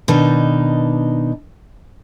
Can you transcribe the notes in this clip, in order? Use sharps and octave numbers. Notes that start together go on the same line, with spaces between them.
B2 D#3 D4 D#4